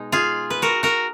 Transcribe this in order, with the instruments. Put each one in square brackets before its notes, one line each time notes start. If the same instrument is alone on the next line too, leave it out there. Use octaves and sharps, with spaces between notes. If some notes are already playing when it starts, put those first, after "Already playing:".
Already playing: [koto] B2 G#3 D#4
F4 G#4
B4
F#4 A#4
F#4 A#4